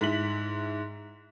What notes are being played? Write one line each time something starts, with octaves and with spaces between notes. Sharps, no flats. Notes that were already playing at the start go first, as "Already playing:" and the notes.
G#2 E4 B6 F#7